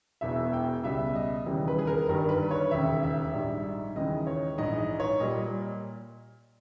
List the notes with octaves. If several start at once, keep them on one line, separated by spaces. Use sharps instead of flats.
E1 E2 B2 E5
G5
C#2 B2 G3 E5
D#5
E1 D#2 C#3 E3 G3
B4
G#4
A#4
G1 G2 D#3 G3 A#4
B4
C#5
E1 D#2 C#3 E5
E5
A#1 G#2 G3
D#2 C#3 E3 G#3 D#5
C#5
A#1 G#2 E3 D#5
D#5
C#5
A#2 G3 D#5